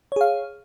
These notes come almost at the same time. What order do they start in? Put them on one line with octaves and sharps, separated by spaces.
C#5 G#4 F5